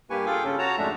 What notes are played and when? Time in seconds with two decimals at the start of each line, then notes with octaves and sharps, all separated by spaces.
0.10 G2 A#3 G4 B4 G#5 C#6
0.26 F4 G#4 A4 G5 D6
0.44 C#3 C#4 A4
0.59 F#4 C#5 A5 A#5
0.78 F2 G#2 G#3 A3 D4 E5